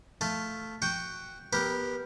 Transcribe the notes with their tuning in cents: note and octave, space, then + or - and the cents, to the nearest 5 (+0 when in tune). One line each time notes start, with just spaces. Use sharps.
A3 +5 F4 -5 A5 +0
F#4 +0 G5 +0 C#6 +0
B3 -15 G4 +0 A#4 +0